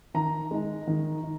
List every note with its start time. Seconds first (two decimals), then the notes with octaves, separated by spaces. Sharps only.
0.14 D#3 A#5
0.51 G#3 D#4
0.87 D#3
1.23 D#4